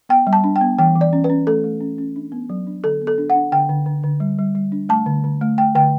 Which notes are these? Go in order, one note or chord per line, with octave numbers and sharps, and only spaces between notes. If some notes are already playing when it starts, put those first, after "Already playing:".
B3 G5
G3
A5
D4
G5
B3
E3 G5
E3
D5
C#4
B4
C#4
A3 A4
A3
C#4
C#4
D4
B3
F#3
D4
D3 A4
B3
A4
D4
F#5
D4
D3 G5
D3
D3
D3
G3
G3
G3
D4
A3 A5
D3
D3
A3
A3 G5
D3 G5